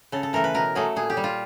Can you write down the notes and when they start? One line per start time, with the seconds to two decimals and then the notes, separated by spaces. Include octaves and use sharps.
0.12 C#3 A4
0.23 A4
0.33 E3 A3 A#4
0.44 B4
0.54 B2 A#4
0.75 F#3 A3 G#4
0.96 A#2 G#4
1.10 G4
1.17 G3
1.24 F4